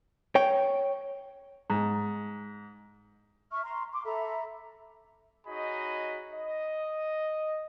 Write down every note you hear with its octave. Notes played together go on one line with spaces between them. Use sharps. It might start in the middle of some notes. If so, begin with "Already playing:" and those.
C#5 G5
G#2
E5 C#6 F6
A#5 C6
C6 D6
A4 E5 A#5 B5
D#4 F#4 G#4 C#5 D#5 B5
D#5